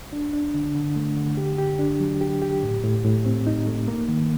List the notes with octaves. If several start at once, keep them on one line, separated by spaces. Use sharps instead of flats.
D4
D4
D3
D3
A3
D3
G4
G4
D4
F#3
G4
G4
A2
A2
A2
C4
D#4
A3
A#3
D#3